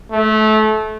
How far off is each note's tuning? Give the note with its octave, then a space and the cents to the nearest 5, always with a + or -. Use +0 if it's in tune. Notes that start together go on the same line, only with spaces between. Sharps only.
A3 -25